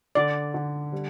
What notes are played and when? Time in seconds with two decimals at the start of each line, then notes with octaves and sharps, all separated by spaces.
0.15 D3 D5
0.54 D3
0.93 G3